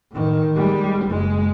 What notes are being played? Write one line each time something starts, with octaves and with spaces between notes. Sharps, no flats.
A2 D#3
G3 G#3
F#1 G#3